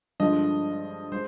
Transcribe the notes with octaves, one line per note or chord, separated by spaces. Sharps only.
G2 D3 F3 G#3 D#5
G#3 C5